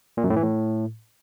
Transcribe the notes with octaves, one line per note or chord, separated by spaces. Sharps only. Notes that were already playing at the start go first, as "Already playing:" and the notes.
A#2
F#2
A2
E3
A2